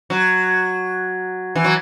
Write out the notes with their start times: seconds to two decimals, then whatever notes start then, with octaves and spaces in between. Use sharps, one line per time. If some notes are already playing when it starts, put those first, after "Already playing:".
0.10 F#3
1.55 E3
1.64 F#3